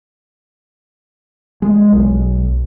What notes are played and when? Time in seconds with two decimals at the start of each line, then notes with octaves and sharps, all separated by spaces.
1.62 G#3
1.92 B1